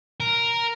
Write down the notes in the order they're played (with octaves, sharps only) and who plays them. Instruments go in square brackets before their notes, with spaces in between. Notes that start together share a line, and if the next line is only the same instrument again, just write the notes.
[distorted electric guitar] A#4